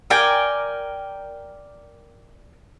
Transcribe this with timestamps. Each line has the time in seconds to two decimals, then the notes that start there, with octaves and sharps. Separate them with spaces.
0.10 A#4 D5 G5 G#5